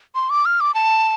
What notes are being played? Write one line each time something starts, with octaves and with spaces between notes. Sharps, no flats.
C6
D6
F6
D6
A5